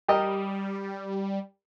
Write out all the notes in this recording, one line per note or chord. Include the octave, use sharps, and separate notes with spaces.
G3 G4 A#4 D#5